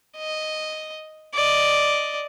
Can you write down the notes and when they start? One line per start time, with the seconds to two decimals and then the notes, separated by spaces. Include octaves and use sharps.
0.17 D#5
1.34 D5 D#5